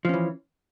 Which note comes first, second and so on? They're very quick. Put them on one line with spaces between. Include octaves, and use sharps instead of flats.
F3 C#4 E3